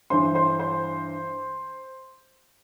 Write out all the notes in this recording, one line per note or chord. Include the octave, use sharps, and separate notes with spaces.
G2 E3 C5 C6
C5 C6
C5 C6